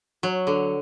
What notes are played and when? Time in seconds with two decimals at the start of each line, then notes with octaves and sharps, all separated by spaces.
0.23 F#3
0.47 D3